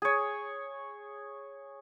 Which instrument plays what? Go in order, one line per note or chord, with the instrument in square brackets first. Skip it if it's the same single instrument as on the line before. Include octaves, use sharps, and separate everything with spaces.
[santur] G#4 C#5